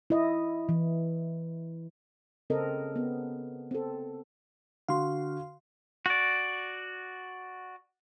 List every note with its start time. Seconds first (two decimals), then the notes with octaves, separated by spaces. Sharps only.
0.10 E4 D#5
0.69 E3
2.50 C#3 C4 A4 A#4 D#5
2.96 B3
3.71 C4 A4
4.89 D3 F#4 F5 C6
6.06 F#4 D5